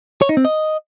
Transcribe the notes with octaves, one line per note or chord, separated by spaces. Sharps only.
C#5
D#4
C4
D#5